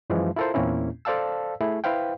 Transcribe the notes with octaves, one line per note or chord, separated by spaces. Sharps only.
F#2 E3 F3 G#3
E4 F4 A4 A#4 C5
E2 A#2 A#3 C4 C#4 E4
A4 C5 D5 F5 A5 E6
A3 E4 G#4
E4 B4 C5 F5 G5